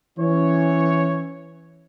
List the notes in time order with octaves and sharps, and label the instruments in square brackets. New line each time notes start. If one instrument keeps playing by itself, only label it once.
[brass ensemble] E3 C#4 C#5